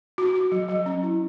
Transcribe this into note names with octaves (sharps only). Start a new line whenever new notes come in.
F#4
F#4
F#3
F#3
C#4
E4